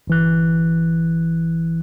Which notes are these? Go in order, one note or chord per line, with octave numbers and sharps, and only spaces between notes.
G1 E3 F#6